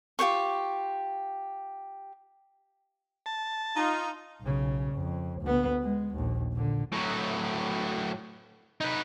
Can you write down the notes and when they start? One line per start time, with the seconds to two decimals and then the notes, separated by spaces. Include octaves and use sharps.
0.19 F4 G4 C5 C#6
3.26 A5
3.77 D#4 F4
4.41 B1 C#3
4.93 F2
5.42 D2 B3
5.83 G#3
6.15 A#1 D#2
6.52 A#2 D3
6.93 A2 F#3
8.81 D#4 B4